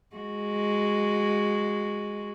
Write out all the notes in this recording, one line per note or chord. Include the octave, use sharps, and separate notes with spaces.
G#3 F#4